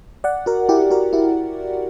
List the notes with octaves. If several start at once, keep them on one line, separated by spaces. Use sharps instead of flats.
D5 F#5
F#4 A#4
E4 G4
F#4 A#4
E4 G4